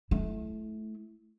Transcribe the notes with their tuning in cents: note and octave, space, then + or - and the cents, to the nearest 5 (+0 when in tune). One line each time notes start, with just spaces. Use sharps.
A3 -25 E4 +0